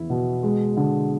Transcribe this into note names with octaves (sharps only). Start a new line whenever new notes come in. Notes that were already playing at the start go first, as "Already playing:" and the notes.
Already playing: E2 E4
B2
G#3
D3